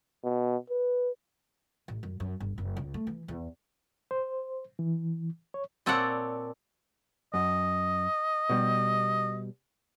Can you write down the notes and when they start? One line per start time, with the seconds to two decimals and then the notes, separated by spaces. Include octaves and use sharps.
0.24 B2
0.70 B4
1.88 A1
2.03 F#2
2.20 F#2
2.40 G1
2.58 F#1
2.77 C#2
2.94 A3
3.07 E3
3.28 E2
4.11 C5
4.79 E3
5.54 C#5
5.86 A#2 C4 A4 C#5 D5 F#5
7.34 F#2 D#5
8.49 B2 G3